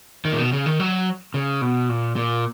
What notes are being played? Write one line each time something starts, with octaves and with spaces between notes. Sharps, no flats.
D#3
A#2
B2
C#3
D#3
F#3
C#3
B2
A#2
A#2